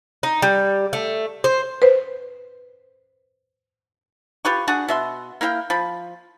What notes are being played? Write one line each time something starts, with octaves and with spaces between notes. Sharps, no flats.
D#4
G3
A3
C5
B4 C5
F4 G4 B4 C#6
D4 F#4 G#4 F#5
B2 E5 C6
A#3 E4 F5 G5
F3 B5